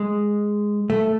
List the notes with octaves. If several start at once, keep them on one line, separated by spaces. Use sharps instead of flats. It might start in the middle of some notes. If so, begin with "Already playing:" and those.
Already playing: G#3
A3